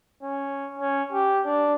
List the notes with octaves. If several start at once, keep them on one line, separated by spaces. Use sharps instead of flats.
C#4
C#4
G4
D4